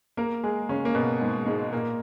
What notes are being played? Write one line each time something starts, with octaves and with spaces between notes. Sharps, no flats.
A#3 A#4
G#3 G#4
C#3 C#4
A#3
B2 B3
G#2 G#3
G#2 G#3
A#2 A#3